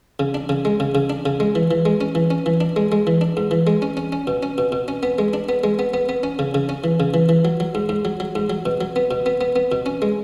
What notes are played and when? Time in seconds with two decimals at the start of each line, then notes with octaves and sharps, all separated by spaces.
0.20 C#3
0.34 D4
0.49 C#3
0.65 G#3
0.80 C#3
0.95 C#3
1.10 D4
1.26 C#3
1.40 G#3
1.55 E3
1.71 E3
1.85 G#3
2.01 C#4
2.15 E3
2.31 C#4
2.46 E3
2.61 D4
2.76 G#3
2.92 G#3
3.07 E3
3.21 D4
3.37 G#2
3.51 E3
3.67 G#3
3.82 C#4
3.97 C#4
4.12 C#4
4.27 B2
4.43 C#4
4.58 B2
4.72 B2
4.88 C#4
5.03 B3
5.19 G#3
5.34 D4
5.49 B3
5.64 G#3
5.79 B3
5.94 B3
6.09 B3
6.23 C#4
6.39 C#3
6.55 C#3
6.69 C#4
6.84 E3
7.00 C#3
7.14 E3
7.29 E3
7.45 F#3
7.60 F#3
7.75 G#2
7.89 G#2
8.05 F#3
8.20 F#3
8.36 G#2
8.50 F#3
8.66 B2
8.81 F#3
8.96 B3
9.11 B2
9.26 B3
9.41 B3
9.56 B3
9.72 B2
9.86 C#4
10.02 G#3